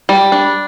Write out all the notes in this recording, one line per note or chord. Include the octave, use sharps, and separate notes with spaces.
G3
D4